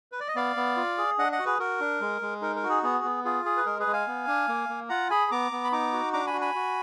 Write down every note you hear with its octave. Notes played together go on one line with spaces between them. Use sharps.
B4
D5
D#5
B3 D5 F5
B3
F4
G#4
D4 D#5 F#5
D#5 F#5
F#4
G#4 B4
F#4 A#4
D4
G#3
G#3
D#4 A#4
A#4
F#4
G#4
B3 G#4
B3
F4 G#4
G#4
B4
G#3 A#4
G#4 B4
G#3
F5 G#5
B3
D4
A#3
A#3
F4 F#5 A#5
G#4 G#5 B5
B3 A#5 D6
B3
B5
D#4 A#5 D6
F#4
D4 A#5 D6
G#5 B5
F#4
G#5 B5
F#4